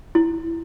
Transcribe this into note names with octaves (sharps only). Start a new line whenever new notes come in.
E4